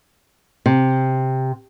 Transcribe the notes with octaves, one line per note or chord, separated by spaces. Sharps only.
C3